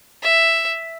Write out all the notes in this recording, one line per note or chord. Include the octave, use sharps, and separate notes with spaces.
E5